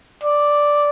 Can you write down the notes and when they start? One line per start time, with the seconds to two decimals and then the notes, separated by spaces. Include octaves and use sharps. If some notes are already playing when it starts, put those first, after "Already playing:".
0.23 D5